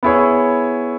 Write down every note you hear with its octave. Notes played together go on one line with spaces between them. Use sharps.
B3 E4 G#4 C#5